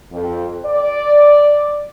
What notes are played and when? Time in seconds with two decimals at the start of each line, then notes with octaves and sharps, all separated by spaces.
0.11 F2
0.65 D5